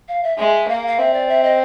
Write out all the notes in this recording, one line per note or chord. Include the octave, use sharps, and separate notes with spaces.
F5
E5
G#3 E5
A#3 F5
F5
C4 E5
D5
E5
D#5